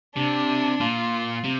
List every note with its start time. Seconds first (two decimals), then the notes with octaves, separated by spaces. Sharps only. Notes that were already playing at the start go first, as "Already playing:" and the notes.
0.16 C3 D4
0.80 A#2 F4
1.44 C3